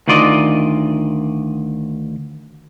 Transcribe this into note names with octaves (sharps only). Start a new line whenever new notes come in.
D2 D#3 F4 D5 D#5